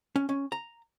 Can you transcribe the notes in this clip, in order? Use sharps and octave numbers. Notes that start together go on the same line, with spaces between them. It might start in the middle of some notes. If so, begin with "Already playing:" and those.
C#4
C#4
A#5